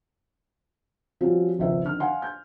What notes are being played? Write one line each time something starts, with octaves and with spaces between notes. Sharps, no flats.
F3 G3 C4 C#4 F4 F#4
G#1 C#2 F3 C5 E5
D3 D#3 F6
F5 F#5 G#5 C6
G6